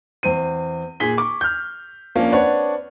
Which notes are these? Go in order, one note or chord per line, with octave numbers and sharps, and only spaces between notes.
E2 C4 D#7
A#2 G#4 B6 G7
C#6 D6
F6 G6
F3 A#3 C#4 D4
C4 D4 B4 C#5 D5 F#5